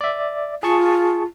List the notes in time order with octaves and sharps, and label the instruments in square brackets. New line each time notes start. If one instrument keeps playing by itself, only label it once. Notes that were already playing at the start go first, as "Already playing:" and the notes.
[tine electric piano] D5 E5
[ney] F4 [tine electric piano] G#4 A5 C#6